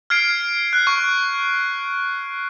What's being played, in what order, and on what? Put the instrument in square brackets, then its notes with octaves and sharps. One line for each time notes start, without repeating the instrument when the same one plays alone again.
[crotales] F6 G#6 C7 D7
F#6
C#6